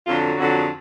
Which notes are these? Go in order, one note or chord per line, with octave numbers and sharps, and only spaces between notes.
F2 D3 F#3 F4
F2 D3 F#3 F#4
F#4
G#4